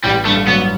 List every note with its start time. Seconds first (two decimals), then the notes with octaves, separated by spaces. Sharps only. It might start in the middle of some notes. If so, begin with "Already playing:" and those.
0.04 A1 G3
0.25 G2 A3
0.48 F#3 B3